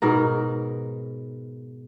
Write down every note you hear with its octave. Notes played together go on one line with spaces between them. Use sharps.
G#2 B2 A#4